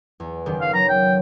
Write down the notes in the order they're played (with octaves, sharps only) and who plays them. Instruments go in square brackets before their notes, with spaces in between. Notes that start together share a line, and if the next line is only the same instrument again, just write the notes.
[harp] E2
F#1 D#3 G4
[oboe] F5
[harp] F#3 [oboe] A#5
[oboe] G5